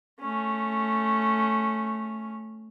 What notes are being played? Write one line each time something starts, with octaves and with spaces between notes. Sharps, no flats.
A3 C#4